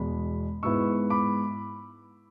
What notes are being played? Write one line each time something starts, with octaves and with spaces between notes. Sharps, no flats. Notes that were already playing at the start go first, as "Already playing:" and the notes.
Already playing: E2 B2 G#3 B5
G#2 G#3 B3 E4 C#6 E6
B5 D6